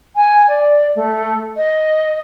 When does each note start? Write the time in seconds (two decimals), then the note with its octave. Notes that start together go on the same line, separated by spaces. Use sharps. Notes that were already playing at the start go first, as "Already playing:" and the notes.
0.15 G#5
0.48 D5
0.95 A3
1.57 D#5